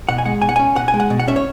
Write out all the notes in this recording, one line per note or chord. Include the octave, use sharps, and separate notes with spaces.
B2 F#5
G#5
G#3 F#5
B2 G#5
F#5
C#4 G#5
B2 F#5
G#5
G#3
F#5
B2
F#5
C#4 E5
C#5